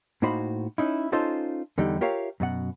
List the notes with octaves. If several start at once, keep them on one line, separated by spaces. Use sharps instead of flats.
A2 A#3 D#4 F#4 C5 B5
C#4 D#4 E4
C#4 D#4 F4 A4 C5
E2 D3 G3 D#4 G4
F4 G4 A#4 C#5 E5 F5
F#2 B2 F#5